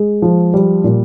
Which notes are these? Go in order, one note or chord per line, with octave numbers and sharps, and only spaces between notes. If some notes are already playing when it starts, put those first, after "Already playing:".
Already playing: G#3
F3
G3
A#2